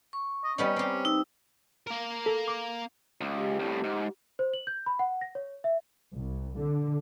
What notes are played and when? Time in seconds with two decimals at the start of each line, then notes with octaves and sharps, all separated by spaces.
0.13 C#6
0.44 D#5
0.58 G3 B3 C#4 D#4
0.76 C4 G4
1.05 D#4 E6
1.87 A#3 A#4
2.26 A4
2.48 D6
3.21 C#2
3.36 G4
3.59 C2 A2
3.84 G#2
4.39 C5
4.53 F#7
4.67 G6
4.86 B5
4.99 F#5
5.21 A#6
5.35 C#5
5.64 E5
6.16 C2
6.58 D3